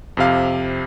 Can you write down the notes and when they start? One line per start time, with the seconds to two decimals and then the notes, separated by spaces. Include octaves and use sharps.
0.17 F2 C3 F5